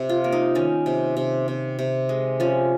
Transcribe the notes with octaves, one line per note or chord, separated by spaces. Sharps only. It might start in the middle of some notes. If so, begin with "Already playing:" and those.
Already playing: C3 C5
F4
A#3
D#4
D#3 C#4
C3
C3
C3
C3
G#3
F3 C#4